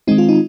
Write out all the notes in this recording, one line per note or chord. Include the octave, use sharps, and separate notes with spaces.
D#3 G#3 C4 D#4
F4
D#4